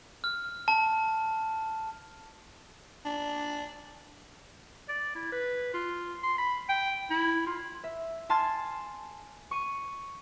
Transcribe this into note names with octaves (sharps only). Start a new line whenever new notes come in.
F6
A5
D4
D5
E4
B4
F4
C6
B5
G5
E4
F4
E5
G#5 A5 C6 F6 A6
C#6 D#7